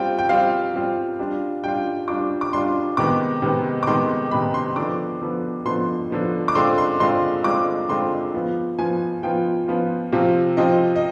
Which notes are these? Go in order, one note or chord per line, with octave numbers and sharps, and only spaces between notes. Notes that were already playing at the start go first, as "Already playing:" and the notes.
Already playing: G3 C4 F4 G5
G5
G3 C4 F4 F5
G3 C4 F4
G3 D4 F4
G3 D4 F4 G5
G3 D4 F4 D6
D6
G3 D4 F4 C6
C3 D#3 G#3 B3 D6
C3 D#3 G#3 B3
D6
C3 D#3 G#3 B3 C6
C3 D#3 G#3 B3 B5
C6
D3 F3 B3 D6
D3 F3 B3
D3 F3 B3 C6
D3 F3 B3
D6
D3 G#3 C4 F4 C6
C6
D3 G#3 C4 F4 C6
D3 G#3 C4 F4 D6
D3 G#3 C4 F4 C6
F3 B3 F4
F3 B3 F4 G#5
F3 B3 F4 G5
F3 B3 F4
C3 F3 C4 F4
C3 F3 C4 F4 D#5
D#5